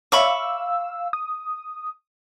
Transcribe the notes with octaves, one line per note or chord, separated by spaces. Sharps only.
C#5 D5 E5 F5 B5 C#6 D6 E6
D#6